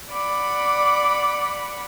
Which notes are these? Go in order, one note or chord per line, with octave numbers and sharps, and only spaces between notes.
D5 F#5 B5 D6